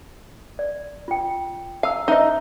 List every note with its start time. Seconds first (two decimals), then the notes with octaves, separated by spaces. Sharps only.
0.59 D5
1.08 F4 G5
1.83 F5 A5 A#5 E6
2.08 D#4 C5 D#5 E5 A5